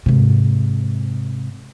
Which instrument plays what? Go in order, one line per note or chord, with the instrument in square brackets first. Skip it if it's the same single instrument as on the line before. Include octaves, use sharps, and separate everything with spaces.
[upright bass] G#2 C3